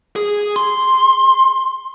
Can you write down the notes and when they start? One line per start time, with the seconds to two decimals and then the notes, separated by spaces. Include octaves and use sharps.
0.16 G#4
0.56 C6